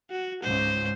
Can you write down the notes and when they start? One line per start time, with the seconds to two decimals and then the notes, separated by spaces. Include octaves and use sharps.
0.11 F#4
0.43 C#2 G#2 C5